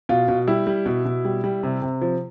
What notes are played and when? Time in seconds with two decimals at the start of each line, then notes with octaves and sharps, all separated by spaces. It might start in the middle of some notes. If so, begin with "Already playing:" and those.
0.09 B2 F4
0.28 B2
0.47 G3 E4
0.67 G3
0.86 B2
1.05 B2
1.25 G3
1.44 G3
1.63 C3
1.82 C3
2.02 F3